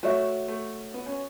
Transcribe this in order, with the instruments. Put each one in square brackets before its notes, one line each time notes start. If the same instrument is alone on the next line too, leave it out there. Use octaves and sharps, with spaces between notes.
[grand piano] A3 [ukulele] F#4 C#5 E5
[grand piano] A3
B3
C#4